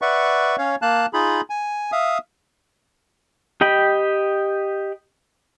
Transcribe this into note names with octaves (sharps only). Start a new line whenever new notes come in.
B4 D5 E5 F#5 C#6
C#4 C#5 F5
A#3 F5 A5 F#6
D#4 F4 G#4 B5
G#5
E5 F5 D#6
G4 D#5 G5 B5